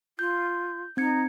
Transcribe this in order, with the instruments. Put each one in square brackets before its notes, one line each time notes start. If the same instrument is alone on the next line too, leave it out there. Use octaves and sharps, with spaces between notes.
[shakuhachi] F4 [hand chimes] G6
[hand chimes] C4 G#6 C#7 [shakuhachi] D#4